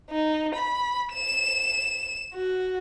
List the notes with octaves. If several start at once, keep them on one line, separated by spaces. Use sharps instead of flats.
D#4
B5
E7
F#4